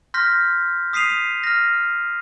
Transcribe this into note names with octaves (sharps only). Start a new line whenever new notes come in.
C6 F6 G6 A#6 B6
D#6 B6 C7 D#7 F7
F6 A#6